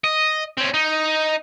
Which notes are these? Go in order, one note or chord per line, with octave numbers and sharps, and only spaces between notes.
D#5
C4 C#4
D#4